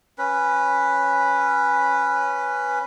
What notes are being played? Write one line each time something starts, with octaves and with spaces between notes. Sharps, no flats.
C#4 B4